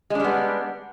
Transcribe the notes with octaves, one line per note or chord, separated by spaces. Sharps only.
G3 G#3 B3 D4